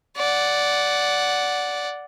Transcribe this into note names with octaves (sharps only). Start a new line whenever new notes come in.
D5 F#5